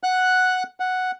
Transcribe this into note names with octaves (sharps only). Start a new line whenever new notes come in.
F#5 F#6
F#5